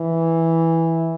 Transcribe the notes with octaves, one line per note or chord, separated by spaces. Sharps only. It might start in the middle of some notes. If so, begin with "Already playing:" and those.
Already playing: E3